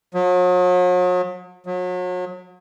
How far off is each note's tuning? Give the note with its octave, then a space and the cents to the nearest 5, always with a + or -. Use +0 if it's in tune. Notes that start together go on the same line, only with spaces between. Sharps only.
F#3 -40
F#3 -35